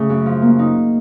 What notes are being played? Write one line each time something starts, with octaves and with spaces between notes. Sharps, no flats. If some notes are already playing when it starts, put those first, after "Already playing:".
Already playing: C#3 A3
F#2
F3
A#3
D#4